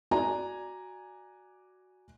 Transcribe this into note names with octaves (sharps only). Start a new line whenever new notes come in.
F#4 D5 G#5 A#5